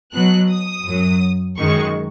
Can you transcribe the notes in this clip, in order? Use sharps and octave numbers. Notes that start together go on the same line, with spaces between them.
B2 F#3 F#6
D#6
F#2 F#3
F#2 D#3 G#3 C#6